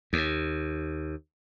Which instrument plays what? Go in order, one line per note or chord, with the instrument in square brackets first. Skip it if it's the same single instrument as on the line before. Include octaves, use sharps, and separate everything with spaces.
[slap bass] D#2